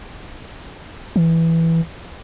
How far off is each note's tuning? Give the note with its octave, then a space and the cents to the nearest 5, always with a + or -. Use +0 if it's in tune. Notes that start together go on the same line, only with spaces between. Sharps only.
E3 +0